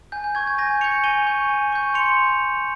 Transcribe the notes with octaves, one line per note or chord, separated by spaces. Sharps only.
G#5 G6
G6
C#6 G6 G#6
G#6
G#5 G6 A#6
C#6 G6 C#7 F7
G#5 D#7 G7
C#6 G6
G#5
C#6 G6
C6 C#7 F7